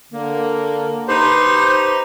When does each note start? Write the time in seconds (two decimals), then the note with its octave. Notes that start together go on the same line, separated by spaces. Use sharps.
0.12 D3 A#3
1.08 D#4 G4 B4 C5